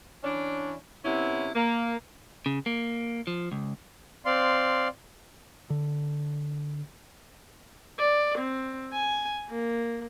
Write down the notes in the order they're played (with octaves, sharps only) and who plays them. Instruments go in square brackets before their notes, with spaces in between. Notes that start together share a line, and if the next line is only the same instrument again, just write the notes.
[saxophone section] E3 C#4 D4
C3 B3 C#4 E4
A#3
[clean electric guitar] C#3
A#3
F3
C#2
[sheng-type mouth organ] C4 D5 F5 C6
[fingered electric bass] D3
[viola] D5
C4
G#5
A#3